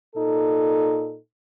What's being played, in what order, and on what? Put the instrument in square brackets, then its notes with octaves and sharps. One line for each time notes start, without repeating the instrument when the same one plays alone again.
[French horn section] A#2 D#4 A4